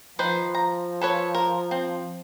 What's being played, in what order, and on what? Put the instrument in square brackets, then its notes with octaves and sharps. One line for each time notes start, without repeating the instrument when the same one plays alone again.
[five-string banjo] D#3 B4 C5 [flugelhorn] F3
[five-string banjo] A#5
A4 B4 C#5
A#4
C4